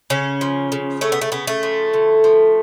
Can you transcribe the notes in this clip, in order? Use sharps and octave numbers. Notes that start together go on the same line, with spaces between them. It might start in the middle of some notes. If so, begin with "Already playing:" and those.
C#3 C#4
F3
C#3
A3 C#4
B3
A3
C#3 B3
A3
F3
D3
F3